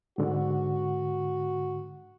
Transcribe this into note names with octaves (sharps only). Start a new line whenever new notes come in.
G#2 D3 F#4